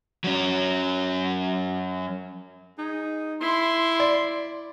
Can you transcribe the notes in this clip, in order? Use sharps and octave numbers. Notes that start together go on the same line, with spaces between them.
F#3 C#4
D#4 G#4
E4 C6
D5